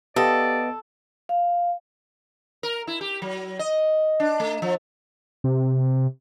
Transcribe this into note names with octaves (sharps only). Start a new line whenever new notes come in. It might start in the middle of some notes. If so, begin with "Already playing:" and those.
B3 G4 A4 D5 D#5 F5 G5
F5
A#4
E4
G4
F#3
D#5
D4
A3
F3
C3